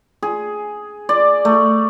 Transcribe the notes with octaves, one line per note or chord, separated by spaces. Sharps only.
G#4
D5
A3